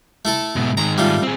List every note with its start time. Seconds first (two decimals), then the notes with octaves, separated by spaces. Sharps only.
0.25 A3 E4 A4
0.56 G#2 B2
0.77 G#2 D#3 A#5
0.98 G3 A3 F4
1.23 C4 G#4